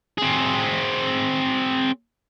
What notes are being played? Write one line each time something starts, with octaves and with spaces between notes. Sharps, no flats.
C4 G#4